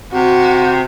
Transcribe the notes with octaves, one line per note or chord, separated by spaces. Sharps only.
C3 F#4